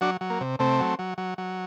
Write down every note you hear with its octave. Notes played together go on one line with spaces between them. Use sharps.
F#3 D4 F#4
F#3
A#3
C3
C3 A3 C4
F#3
F#3
F#3
F#3